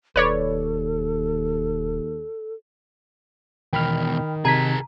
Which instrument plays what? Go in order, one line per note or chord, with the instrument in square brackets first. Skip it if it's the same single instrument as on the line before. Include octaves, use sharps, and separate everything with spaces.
[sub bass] E1 [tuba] D#2 [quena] A4 [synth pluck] B4 C#5 D5
[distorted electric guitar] E2 B2 [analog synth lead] D#3 [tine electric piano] G5 B5 F6
[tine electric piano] C3 G#6 B6 [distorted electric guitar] G#4 A#4 [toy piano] A5 A#5